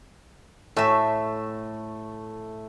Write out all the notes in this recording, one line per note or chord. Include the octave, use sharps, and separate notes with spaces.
A2 A3 E5